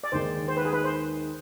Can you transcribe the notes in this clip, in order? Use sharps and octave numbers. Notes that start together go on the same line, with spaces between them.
D5
D#2 D#3 G#3 C5
C5
B4
G#4
B4
C5